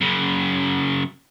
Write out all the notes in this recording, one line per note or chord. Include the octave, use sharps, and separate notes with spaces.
F#2 C#3